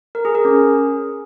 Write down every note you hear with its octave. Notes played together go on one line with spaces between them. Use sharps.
A#4
G#4
A#4
C#4